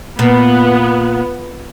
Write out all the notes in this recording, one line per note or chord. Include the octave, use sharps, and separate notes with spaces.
A#2 B3